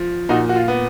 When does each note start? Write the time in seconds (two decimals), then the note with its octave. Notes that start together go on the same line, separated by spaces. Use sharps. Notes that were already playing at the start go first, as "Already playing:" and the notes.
Already playing: F3
0.29 A#2 D#4 F#4
0.49 F#4
0.56 F4
0.68 B3